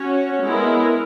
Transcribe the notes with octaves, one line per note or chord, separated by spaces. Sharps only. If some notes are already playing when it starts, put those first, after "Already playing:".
Already playing: C#4 F#4 C#5
G#3 B3 E4 A#4